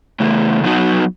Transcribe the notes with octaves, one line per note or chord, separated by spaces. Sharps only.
C#3 E3 A3
F#3 B3 D#4 F#4